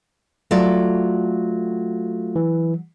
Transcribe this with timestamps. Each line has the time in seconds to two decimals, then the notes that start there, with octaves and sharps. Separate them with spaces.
0.51 F#3 A3 F4 F#4 A4 D5
2.36 E3